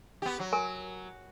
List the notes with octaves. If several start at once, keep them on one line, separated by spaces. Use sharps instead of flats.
B3 G4
F#3
A#4 G#5